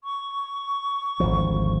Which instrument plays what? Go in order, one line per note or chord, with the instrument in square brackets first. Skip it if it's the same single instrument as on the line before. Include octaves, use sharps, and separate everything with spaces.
[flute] C#6
[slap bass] G#1 D2 F3